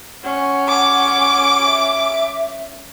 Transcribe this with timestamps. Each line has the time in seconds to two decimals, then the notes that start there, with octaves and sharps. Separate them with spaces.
0.24 C#4 F#5
0.69 D6
1.66 E5